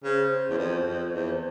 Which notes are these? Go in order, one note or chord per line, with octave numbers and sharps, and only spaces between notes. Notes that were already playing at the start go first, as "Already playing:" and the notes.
C#3 C5
E2
F2
F2
E2